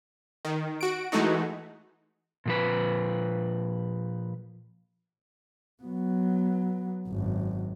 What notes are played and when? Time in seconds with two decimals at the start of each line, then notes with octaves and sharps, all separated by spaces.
0.45 D#3
0.81 F#4 D7
1.12 E3 G#3 A3 D#4 F#4
2.46 A#2 F3 B4
5.83 F#3 B3
7.08 G#1 F#2